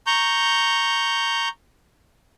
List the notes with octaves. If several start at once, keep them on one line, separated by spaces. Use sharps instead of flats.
A#5 C#6 G6